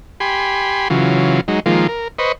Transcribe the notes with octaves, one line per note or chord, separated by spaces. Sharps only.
G4 G#5 B5 C6
C#3 E3 F#3 F4
F#3 G#3 D#4
D#3 F3 G#3 A#3 F4
A#4
B4 C5 D#5 C#6